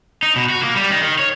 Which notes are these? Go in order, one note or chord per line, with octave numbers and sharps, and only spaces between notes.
D#4
B2
F#4
A#3
G3
D#3
D#3
C#5